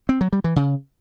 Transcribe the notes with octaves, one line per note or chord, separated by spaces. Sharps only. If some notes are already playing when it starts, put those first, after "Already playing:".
C4
F#3
G3
E3
C#3